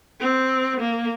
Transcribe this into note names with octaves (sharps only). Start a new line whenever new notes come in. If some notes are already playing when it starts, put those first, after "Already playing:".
C4
A#3